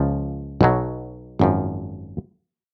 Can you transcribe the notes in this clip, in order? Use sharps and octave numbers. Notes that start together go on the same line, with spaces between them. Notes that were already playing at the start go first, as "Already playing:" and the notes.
Already playing: C#2 C#3 F3
B1 B2 F#3
G#1 F#2 F3